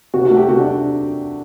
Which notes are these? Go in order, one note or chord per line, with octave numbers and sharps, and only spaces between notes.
C3 F#4
F#4
A3
G4
C3 F#4
D4